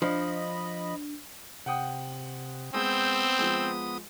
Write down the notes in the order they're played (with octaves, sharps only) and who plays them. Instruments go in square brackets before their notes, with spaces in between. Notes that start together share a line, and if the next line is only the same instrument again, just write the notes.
[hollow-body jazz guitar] F3 [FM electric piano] D4 [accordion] D#5 B5
[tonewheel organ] C3 [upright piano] F#5 G5 D#6
[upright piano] G#3 [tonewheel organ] B3 D#6 [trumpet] C4 [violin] E6 G6
[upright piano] F3 G#3